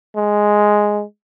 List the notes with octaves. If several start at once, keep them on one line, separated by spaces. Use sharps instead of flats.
G#3